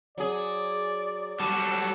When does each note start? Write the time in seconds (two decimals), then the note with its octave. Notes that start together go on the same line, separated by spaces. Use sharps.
0.18 F#3 G#4 D5
1.40 F#3 G3 A4